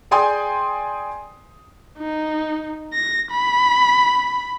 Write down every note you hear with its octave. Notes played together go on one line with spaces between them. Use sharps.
G#4 D5 G5 G#5 C6 D#6
D#4
A#6
B5